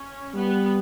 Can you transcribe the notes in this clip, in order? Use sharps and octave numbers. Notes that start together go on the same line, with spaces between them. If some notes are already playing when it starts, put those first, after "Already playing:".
Already playing: C#4
G3 B3